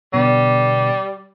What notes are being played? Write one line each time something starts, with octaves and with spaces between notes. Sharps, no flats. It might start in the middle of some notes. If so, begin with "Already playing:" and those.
B2 D3 G3 B3